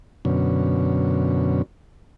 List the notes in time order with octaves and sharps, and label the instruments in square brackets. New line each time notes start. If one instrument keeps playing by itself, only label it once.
[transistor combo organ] F#2 B2 D3 C#4